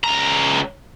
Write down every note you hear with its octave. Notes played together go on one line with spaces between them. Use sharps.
C#2 A#5